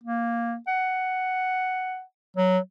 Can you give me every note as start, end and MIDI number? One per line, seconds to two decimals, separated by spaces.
0.03 0.56 58
0.67 2.02 78
2.37 2.58 54